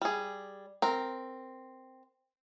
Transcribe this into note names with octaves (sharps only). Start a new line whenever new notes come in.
G3 G#4
C4 A#4